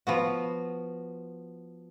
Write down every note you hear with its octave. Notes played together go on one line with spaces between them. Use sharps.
F3 B3 F#4